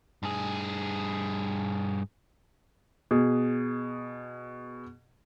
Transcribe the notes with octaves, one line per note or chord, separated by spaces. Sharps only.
G2 G#4
B2 G#4